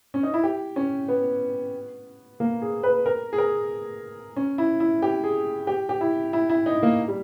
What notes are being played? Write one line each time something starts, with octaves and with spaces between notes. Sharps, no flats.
C#4
D#4
E4
G4
C#4
B3
A#3
G#4
B4
A#4
G#4
A#4
C#4
E4
E4
G4
G#4
G4
G4
E4
E4
E4
D#4
A#3
G3